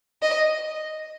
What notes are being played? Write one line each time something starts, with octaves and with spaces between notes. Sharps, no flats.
D#5